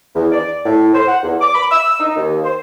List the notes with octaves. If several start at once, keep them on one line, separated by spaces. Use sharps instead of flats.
E2
D5
A2
C5
F#5
E2
D6
B5
E6
D#4
D#2
C5